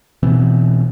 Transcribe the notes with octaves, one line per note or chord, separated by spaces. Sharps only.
B2 E3 C4